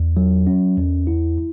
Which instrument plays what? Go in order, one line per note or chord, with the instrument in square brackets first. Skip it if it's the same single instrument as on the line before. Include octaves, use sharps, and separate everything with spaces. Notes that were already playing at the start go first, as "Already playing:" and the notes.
Already playing: [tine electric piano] E2
F#3
C#4
E2
E4